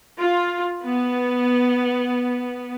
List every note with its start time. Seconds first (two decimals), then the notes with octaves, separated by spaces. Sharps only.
0.17 F4
0.84 B3